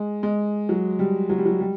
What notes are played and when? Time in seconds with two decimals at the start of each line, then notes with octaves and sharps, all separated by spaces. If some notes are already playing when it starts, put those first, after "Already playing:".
Already playing: G#3
0.23 G#3
0.69 F#3
0.99 G3
1.30 F#3
1.38 G3
1.45 F#3
1.60 G3